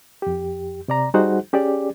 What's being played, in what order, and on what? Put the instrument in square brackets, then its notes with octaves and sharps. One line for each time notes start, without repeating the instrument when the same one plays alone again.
[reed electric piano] F2 G4
C3 D5 A#5
G3 D#4 F#4 G#4 C5 F#5
C#4 G4 G#4 D5